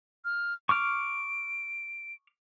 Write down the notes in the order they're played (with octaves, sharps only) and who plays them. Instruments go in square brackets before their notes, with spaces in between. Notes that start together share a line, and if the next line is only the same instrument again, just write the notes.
[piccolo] F6
[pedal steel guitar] C#6 D6 F6 [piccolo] D7